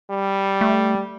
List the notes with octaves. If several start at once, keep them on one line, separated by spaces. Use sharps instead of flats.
G3
A3